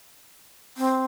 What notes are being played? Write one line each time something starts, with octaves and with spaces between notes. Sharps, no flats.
C4